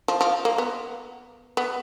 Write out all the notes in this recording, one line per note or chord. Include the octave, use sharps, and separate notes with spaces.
F3
F3
A#3
B3
B3